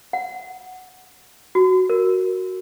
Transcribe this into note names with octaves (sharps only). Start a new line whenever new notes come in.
F#5
F#4
A#4